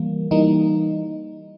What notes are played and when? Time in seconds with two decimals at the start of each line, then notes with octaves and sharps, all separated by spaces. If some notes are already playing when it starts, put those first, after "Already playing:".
Already playing: E3 G3 A#3
0.31 E3 G3 A#3 D#4